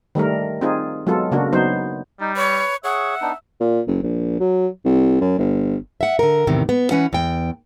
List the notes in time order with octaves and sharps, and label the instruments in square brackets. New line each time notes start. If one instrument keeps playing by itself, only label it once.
[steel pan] D#3 G3 A3 A#4
C4 D#4 F4 G#4
F#3 G#3 B3 F4 A4
C#3 A#3 D4 F#4 A#4
F#3 B3 D#4 C5
[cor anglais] G3 [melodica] D#4
[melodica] B4 [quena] C#5
[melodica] G#4 C#5 [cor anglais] E5 [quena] F#5
[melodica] B3 D4 D#4
[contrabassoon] A#2
F#1
A#1
F#3
C2
F#2
G1
[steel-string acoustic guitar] E5 F#5
D3 A#4
E2 A2 C3 D#3
B3
E3 C#4 B4 F#5
E2 G5